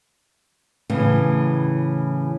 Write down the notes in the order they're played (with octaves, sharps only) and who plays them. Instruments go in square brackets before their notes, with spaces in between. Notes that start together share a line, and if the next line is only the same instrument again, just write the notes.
[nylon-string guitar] A2 C#3 E3